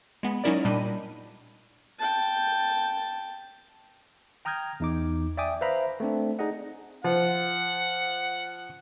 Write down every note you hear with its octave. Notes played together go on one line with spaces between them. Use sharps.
G#3 B3
F#3 C#4 D#4 E4 A#4 D5
A#2 G3 D4 D#5 B5 D#7
G5 A5
G5 A#5 D#6 F6 G6 G#6
E2 D#4 D6
D5 E5 G5 G#5 D6 D#6
B4 C5 E5 F5 A#5 B5
A3 C4 D4
D#4 G#4 D5 D#5 F#5
F3 F#5